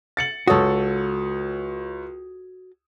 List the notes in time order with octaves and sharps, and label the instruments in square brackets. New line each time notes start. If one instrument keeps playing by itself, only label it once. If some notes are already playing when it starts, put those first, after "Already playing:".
[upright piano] A6 C#7 F#7
[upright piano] C#2 C#5 D#6 [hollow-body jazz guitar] F#4 A4